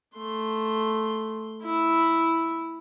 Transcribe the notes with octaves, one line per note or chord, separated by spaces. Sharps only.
A3 C6
E4